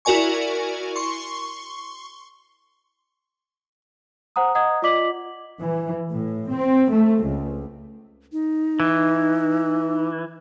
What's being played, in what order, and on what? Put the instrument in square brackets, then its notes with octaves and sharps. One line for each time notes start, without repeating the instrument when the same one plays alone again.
[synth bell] E4 F#4 A#4 D5 G#5 C#6
C6 C#6
[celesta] C5 F#5 A#5 D#6
D#5 F#5 A#5 D#6 G#6
F4 D5 D#5 D6 B6 F#7
[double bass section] E3
A2
C4
A3
C#2
[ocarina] D#4
[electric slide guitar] E3